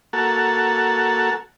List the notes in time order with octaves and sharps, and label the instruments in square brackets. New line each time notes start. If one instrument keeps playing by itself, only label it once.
[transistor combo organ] A#3 F#4 A4